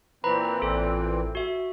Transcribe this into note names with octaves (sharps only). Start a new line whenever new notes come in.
A#2 E3 C4 B4 A#5 B5
A1 A4
F#4 E5